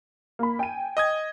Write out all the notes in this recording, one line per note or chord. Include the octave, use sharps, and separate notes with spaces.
A#3 B5
G5 G#5 D#7
D#5 D#6 G#6